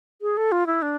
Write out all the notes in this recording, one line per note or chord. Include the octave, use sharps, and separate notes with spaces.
G#4
A4
F4
E4
D4